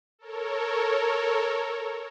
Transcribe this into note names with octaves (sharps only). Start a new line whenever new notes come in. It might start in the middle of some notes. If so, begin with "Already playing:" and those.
A4 A#4 C#5